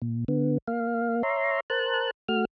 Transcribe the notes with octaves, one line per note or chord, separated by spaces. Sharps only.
A#2
D3 B3
A#3 F5
C#5 E5 A#5 C6
A#4 C5 A5 F#6
A3 F#4 F6